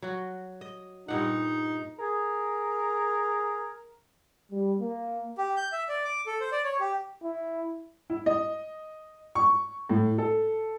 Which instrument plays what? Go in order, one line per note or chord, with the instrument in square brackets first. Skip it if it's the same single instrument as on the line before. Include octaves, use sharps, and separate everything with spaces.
[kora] F#3 F#4
D#5
[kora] G2 A#2 F#5 [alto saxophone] D#4
[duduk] G#4 [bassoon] A#4
[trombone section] G3
A#3
[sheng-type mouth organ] G4
G6
E5
D5
D6
A4
C5
D5
C#5
G4
[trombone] E4
[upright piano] E4
D#5
C#6
A2
A4